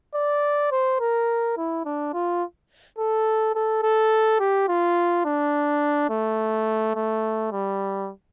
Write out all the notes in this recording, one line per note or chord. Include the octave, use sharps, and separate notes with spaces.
D5
C5
A#4
E4
D4
F4
A4
A4
A4
G4
F4
D4
A3
A3
G3